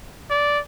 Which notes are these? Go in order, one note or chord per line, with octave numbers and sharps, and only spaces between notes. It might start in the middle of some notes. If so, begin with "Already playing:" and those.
D5